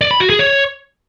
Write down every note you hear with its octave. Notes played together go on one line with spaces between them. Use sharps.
D5
B5
F#4
G#4
C#5